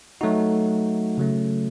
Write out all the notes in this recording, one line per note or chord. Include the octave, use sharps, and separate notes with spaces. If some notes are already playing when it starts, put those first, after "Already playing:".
F#3 A3 D#4 F#4
C#3 F#3 A3 C#4